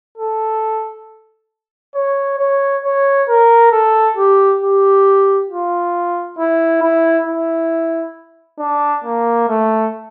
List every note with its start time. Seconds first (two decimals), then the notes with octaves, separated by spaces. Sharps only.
0.18 A4
1.95 C#5
2.39 C#5
2.84 C#5
3.29 A#4
3.72 A4
4.17 G4
4.62 G4
5.50 F4
6.39 E4
6.82 E4
7.27 E4
8.60 D4
9.04 A#3
9.48 A3